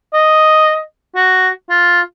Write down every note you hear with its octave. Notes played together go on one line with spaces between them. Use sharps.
D#5
F#4
F4